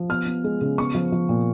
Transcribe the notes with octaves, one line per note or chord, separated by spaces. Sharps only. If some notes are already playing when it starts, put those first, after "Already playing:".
Already playing: F3
B3 F6
B3
G#3
C#3
B3 C#6
F3
F3
A#2